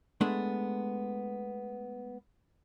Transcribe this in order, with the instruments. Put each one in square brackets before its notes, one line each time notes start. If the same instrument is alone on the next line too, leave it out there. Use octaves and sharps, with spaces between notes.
[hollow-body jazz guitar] G#3 A3 B3 D4